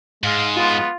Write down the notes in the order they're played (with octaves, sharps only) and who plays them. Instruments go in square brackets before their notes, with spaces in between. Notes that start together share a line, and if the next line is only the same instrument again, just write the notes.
[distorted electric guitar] G#2 [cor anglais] G#3 [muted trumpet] F5
[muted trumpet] B3 [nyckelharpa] F4